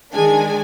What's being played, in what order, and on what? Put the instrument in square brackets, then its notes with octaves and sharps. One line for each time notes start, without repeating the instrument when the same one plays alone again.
[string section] D#3 G#3 D4 G#5